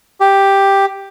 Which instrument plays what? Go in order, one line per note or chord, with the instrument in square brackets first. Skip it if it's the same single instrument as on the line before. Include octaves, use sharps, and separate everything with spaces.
[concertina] G4